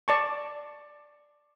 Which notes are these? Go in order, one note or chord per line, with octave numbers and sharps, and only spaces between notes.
D5 A5 C#6